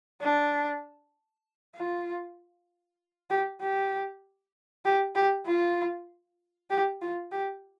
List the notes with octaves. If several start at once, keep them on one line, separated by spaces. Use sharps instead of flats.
D4
F4
G4
G4
G4
G4
F4
G4
F4
G4